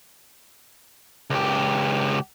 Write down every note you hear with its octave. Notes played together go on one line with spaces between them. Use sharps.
C#2 G4